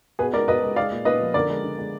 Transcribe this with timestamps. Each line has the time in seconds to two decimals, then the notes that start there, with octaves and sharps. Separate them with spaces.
0.19 B2 G#4 B4
0.33 G#3 A#4 D5
0.48 B2 B4 D#5
0.63 G#3
0.76 G#3 D5 F5
0.92 A#2
1.05 A#2 B4 D#5
1.20 F3
1.34 D3 A#4 D5
1.50 G#3
1.64 D3
1.78 G#3